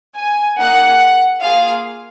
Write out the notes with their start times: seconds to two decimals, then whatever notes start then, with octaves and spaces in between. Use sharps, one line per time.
0.17 G#5
0.59 A#3 D#4 G#4 F#5
1.41 A#3 F4 G#4 F5